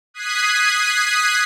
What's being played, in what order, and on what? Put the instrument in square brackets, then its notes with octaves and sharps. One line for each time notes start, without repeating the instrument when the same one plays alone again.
[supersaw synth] D#6 F#6 G#6 B6 C7 D#7